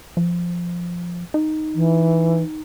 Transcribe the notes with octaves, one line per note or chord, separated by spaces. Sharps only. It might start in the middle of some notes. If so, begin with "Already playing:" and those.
F3
D#4
E3